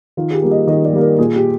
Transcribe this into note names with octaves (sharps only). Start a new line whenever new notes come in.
D#3 F4
G#4
G4
G3 A#3
D#5
D#3 D#5
D5
G3 A#3
A#4
A#2 G#4
G4